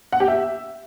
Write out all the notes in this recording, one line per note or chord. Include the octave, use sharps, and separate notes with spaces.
F#5
G4
E5